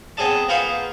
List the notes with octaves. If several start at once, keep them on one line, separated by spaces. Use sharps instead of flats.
B3 C4 G#4 D#5 A5
A#3 F4 G#4 B4 C5 F#5